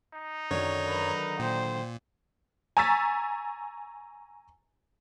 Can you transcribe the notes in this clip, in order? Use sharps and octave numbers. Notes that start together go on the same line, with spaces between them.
D#4
F#2 D3 D#3 F#3 C#5
A#4 B4
A#2 C5 G5
G#5 A#5 C#6 E6 A6 B6